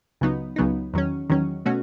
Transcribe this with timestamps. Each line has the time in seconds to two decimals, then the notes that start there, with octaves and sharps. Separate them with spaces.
0.21 C#2 C#3 F#3 B3 D#4
0.56 C#2 C#3 F#3 B3 D#4
0.94 E2 D#3 F#3 C#4
1.30 E2 D#3 F#3 C#4
1.66 B2 A3 C#4 F#4